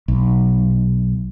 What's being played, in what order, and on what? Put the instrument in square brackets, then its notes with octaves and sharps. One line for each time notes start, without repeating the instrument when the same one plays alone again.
[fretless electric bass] B1